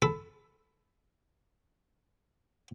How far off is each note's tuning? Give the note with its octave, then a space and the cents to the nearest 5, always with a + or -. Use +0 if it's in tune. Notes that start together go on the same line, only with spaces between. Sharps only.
A4 -10 B5 +15